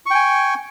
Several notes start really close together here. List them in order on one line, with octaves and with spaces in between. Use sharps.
C#6 G5 G#5